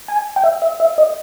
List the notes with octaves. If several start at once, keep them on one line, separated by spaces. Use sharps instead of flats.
G#5
G5
E5
E5
E5
D#5